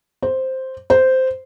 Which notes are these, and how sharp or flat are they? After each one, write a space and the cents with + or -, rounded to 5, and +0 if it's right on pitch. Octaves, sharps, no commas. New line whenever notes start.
C5 +0
C5 -10